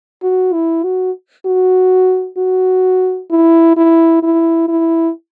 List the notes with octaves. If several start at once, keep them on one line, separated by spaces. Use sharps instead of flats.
F#4
E4
F#4
F#4
F#4
E4
E4
E4
E4